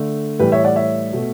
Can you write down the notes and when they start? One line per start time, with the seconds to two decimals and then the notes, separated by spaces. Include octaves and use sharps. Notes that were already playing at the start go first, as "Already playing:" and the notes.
Already playing: D3 A3
0.39 A2 E3 G3 G4 B4
0.52 C#5 E5
0.64 D5 F#5
0.76 C#5 E5
1.13 B2 A3